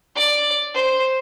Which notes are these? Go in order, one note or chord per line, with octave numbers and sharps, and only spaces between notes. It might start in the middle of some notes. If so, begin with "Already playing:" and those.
D5
C5